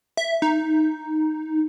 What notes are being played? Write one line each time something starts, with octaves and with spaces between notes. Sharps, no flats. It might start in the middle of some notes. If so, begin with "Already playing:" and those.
E5
D#4